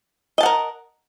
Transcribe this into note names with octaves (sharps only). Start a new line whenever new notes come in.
A#4 D#5 F#5 A5